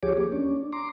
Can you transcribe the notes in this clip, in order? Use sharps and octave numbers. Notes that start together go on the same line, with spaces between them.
D2 F3 G4 G#4 C#5 D6
A#3
C#4 D4
A#5 C6 D6